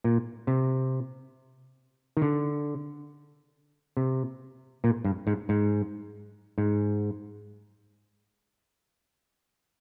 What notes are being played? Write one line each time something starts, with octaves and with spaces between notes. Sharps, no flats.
A#2
C3
D#3
D3
C3
A#2
G2
G#2
G#2
G#2